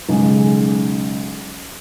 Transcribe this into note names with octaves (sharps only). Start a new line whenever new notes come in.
B1 C#3 G#3